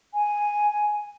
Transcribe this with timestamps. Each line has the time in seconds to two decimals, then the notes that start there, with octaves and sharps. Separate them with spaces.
0.14 G#5